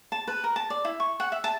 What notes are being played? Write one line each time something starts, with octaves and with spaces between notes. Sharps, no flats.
A5
B4
A#4
A5
D5
E4
C#6
F#5
E5
A5